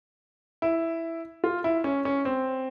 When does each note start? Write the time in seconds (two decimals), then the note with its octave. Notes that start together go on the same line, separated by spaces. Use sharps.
0.62 E4
1.44 F4
1.64 E4
1.84 C#4
2.05 C#4
2.25 C4